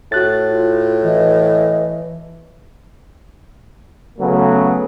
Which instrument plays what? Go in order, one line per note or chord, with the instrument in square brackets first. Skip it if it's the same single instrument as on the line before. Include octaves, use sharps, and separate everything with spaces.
[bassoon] A2 [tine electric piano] F#4 F#6 A6
[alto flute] F4
[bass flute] E3 [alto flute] D#5
[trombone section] C#3 F#3 A3 B3